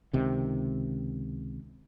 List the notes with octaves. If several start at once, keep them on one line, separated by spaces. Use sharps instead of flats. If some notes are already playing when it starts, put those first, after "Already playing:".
C#2 C3 D#3